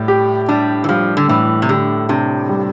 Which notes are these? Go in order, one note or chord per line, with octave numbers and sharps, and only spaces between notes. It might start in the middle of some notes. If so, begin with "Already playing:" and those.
Already playing: A2 G3
G4
G3 D4
E3
F3 G3
D3
A2 E3
C3
D3 G4
C3 D4
G3